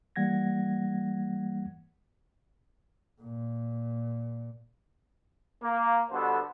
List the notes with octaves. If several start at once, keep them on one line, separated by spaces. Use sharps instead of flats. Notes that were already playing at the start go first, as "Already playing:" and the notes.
E3 G3 A#3 F#5 G#6 A#6
A#2
A#3
B2 D3 G3 B3 A4 C5